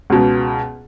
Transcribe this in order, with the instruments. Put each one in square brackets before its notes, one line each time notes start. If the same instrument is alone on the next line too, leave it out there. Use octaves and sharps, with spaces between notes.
[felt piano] C#2 B2